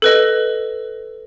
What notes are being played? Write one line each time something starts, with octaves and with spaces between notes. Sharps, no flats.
A4 B4 D#5